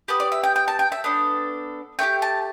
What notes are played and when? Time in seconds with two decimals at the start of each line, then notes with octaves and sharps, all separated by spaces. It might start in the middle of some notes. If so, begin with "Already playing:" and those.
0.08 B3 G4 B4
0.20 D5
0.32 E5
0.44 G5
0.56 G5
0.68 A5
0.79 G5
0.92 E5
1.04 B3 D4 A4
1.99 A3 D4 G4 G5
2.22 A5